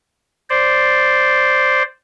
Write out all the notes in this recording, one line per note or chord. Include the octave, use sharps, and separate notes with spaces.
C5 D5